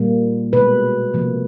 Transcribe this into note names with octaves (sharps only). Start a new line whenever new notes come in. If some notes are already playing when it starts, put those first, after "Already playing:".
Already playing: A#2 G3 A#3
B2 G#3 B4
C3 F3 A#3